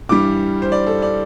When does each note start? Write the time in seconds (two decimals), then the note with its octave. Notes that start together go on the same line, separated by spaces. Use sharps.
0.09 G2 E3 G3 D6
0.62 C5
0.72 D5
0.87 A4
1.02 D5